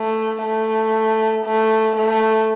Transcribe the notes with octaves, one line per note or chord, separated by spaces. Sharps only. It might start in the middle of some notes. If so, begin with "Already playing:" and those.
Already playing: A3
A3
A3
A3